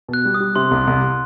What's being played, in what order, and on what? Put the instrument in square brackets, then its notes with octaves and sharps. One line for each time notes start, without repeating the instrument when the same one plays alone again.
[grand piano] B2
[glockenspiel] F#6
[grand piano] G3
[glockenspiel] D#6
[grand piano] G3
[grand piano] C3 [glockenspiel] C6
[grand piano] C2
C2